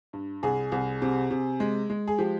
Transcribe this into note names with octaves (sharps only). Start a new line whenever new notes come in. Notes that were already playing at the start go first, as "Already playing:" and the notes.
G2
C2 G#4
C2
C3
C3
G#3
G#3
G#4
F3 G4